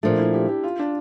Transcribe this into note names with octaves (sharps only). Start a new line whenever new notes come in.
A#2 F3 A3 D4
E4
G4
G4
F4
D4